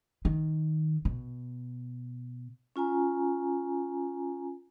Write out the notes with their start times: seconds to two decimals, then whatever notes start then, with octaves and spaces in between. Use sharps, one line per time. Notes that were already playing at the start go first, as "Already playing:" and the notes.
0.25 D#3
1.05 B2
2.76 C#4 F4 G#5 A#5